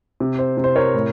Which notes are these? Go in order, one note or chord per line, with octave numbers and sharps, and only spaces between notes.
C3
C5
C3
C5
A#4 C#5
A2